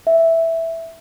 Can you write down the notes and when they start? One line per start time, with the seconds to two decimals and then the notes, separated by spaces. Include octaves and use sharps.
0.07 E5